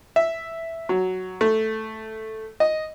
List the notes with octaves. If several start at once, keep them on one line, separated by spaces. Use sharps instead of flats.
E5
F#3
A3
D#5